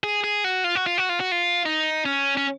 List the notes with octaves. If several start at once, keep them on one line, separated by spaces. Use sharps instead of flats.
G#4
G#4
F#4
F4
F#4
F4
F#4
F4
F#4
F4
D#4
C#4
C#4